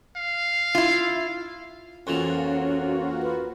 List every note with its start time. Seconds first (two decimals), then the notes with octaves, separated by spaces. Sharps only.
0.16 F5
0.75 E4 F4
2.07 F2 E3 A#3 C#4 F4 F#4
3.22 B4